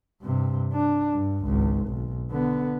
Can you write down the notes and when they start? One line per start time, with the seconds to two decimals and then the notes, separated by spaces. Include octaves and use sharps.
0.22 G2 C3
0.73 D4
1.12 G2
1.45 G#1 C#2
1.87 B1
2.30 D3 B3